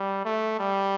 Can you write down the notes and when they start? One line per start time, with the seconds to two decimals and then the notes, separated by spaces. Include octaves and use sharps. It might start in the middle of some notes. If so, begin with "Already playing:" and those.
Already playing: G3
0.25 A3
0.59 G3